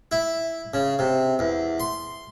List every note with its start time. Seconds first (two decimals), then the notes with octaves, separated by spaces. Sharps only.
0.12 E4
0.74 C#3
0.99 C3
1.39 E2
1.80 C6